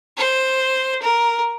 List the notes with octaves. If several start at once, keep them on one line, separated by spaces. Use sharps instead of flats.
C5
A#4